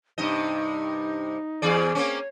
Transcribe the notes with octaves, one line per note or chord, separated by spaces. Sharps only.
G2 C3 D#4 D#5
E2 G#4 D5
A#3 C4 C#4 C#5